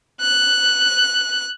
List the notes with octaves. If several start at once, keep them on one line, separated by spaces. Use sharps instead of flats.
F#6